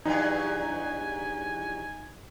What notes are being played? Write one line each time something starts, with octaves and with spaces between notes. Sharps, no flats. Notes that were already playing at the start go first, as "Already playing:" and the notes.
E2 G2 F#3 D#4 G#5